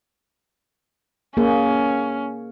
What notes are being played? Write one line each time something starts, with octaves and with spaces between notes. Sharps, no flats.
A#3 C#4 G#4